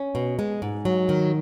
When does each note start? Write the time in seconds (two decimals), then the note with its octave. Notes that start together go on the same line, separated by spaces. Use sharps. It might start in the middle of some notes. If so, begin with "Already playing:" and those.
Already playing: C#4
0.15 B2
0.39 G#3
0.62 G#2
0.85 F#3
1.09 D#3